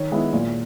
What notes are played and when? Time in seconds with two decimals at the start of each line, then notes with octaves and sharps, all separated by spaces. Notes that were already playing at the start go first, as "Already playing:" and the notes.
Already playing: D#3 C#5
0.11 G#3 B3 E4
0.33 A#2